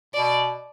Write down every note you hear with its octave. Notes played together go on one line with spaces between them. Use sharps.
B2 D5